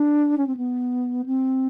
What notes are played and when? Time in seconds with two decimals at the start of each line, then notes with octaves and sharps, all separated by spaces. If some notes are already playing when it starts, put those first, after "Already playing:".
Already playing: D4
0.38 C#4
0.47 C4
0.57 B3
1.26 C4